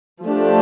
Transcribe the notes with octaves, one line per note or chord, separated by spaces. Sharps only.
F3 A3 D4 G4